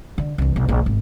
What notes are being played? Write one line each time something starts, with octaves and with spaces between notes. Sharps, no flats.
D3
C2 E3
B1
A#1
G#1